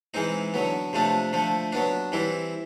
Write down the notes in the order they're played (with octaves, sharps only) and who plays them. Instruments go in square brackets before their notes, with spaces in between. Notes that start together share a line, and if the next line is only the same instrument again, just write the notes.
[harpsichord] E3 G#3 C4 D#4
D3 F#3 B3
C3 F3 A3 D4
D3 F3 A3
F#3 B3 D4
E3 G3 C4 E4